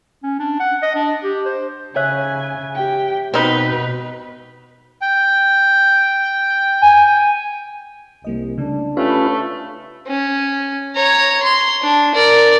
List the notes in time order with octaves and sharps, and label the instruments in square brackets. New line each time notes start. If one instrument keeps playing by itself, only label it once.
[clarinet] C#4
D4
F#5
D#5
D4
G4
C5
[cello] C#3 [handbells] C#5 E5 F#6 [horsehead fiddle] G#5
[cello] G4 [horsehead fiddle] G5
[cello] B2 [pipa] C4 D#4 [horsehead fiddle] B4
[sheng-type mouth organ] G5
[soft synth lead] G#5
[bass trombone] C2 [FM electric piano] G3 A#3 D#5
[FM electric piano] C#3 A3 [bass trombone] D4
[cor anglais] A3 [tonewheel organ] C#4 F4 B4 [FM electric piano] G4 A5 B5
[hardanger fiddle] C#4
C#5 A#5
C6
D4
A#4 D5